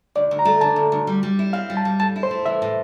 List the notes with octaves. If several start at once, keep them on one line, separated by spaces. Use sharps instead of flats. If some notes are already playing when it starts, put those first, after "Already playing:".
D2 D5
D2
A#5
A3
D3 A5
D2
D2
G3
G3
E4
C4 F5
G3
A5
G3
A2 A5
E4
C5
A3
E3 E5
A2